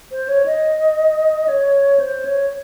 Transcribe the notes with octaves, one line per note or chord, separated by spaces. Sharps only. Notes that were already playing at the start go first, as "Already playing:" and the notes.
C5
C#5
D#5
C#5
C5
C#5